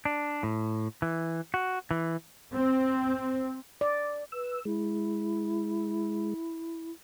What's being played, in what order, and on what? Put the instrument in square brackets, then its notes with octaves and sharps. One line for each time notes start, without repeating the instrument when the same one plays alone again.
[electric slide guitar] D4
A2
E3
F#4
E3
[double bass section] C4
[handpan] D5
[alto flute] B4 [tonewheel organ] E6
[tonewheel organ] G#3 [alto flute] E4